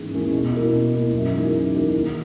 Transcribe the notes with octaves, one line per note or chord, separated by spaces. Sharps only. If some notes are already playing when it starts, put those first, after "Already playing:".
Already playing: G#2 E3 A#3 C#4 G#4
E3 A#3 C#4 G#4
B2
A#3 E4
B2
A#3 E4
F#2
E3 A#3 D#4 G#4
F#2
E3 A#3 D#4 G#4
D#3